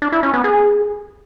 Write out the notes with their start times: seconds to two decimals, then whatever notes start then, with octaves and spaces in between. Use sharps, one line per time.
0.02 D4
0.12 E4
0.23 C#4
0.34 B3
0.44 G#4